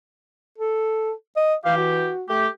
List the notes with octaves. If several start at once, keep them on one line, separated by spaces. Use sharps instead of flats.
A4
D#5
E3 G4 F5
F#4
A3 G4